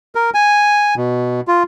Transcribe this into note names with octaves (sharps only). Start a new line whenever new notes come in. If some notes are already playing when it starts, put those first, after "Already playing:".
A#4
G#5
B2
F4